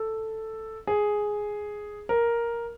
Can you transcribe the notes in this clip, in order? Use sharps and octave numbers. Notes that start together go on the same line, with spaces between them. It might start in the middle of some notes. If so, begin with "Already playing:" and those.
Already playing: A4
G#4
A#4